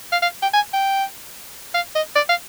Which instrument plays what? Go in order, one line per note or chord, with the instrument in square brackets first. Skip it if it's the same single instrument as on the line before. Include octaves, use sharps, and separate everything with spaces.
[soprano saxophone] F5
F5
G5
G#5
G5
F5
D#5
D5
F5